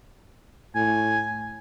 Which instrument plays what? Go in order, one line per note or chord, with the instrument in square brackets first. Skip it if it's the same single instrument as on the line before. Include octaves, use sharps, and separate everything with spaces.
[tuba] A2 [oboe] G#5